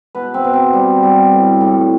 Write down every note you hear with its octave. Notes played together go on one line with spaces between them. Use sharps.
B2 B4
C4
B2
C4
G3
G3
A2
A2